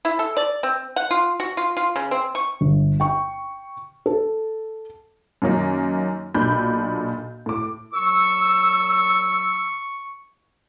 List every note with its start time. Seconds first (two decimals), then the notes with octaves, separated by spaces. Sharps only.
0.05 E4
0.19 A4
0.37 D5
0.63 C4
0.96 F#5
1.11 F4
1.40 F#4
1.57 F4
1.77 F4
1.96 C#3
2.11 C4
2.35 C#6
2.61 G1
3.00 G5 C#6
4.06 A4
5.42 F#2 D#3 F#3 A#3 C#4 D#4
6.34 B1 A#2 D4 B5 G6
7.46 A2 D6
7.93 A#2 F#3 C#6 E6